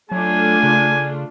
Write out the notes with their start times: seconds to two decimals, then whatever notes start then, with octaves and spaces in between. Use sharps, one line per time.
0.12 F#3 A3 D4 F4 G#5
0.63 C#3